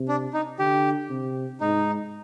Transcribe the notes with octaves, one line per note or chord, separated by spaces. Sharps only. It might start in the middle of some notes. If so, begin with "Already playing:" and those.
Already playing: C3
D4
D#4
D3 G4
C3
G#2 D#4